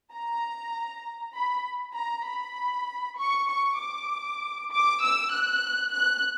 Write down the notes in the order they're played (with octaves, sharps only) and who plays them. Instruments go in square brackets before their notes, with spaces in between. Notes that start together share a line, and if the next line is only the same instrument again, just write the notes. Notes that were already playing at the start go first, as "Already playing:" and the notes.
[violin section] A#5
B5
A#5
B5
C#6
C#6
D6
D6
E6
F#6
F#6